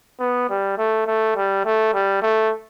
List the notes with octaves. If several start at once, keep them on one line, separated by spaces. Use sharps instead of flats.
B3
G3
A3
A3
G3
A3
G3
A3